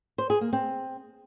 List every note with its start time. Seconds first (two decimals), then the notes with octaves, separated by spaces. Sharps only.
0.18 C5
0.30 G#4
0.41 A#3
0.53 C4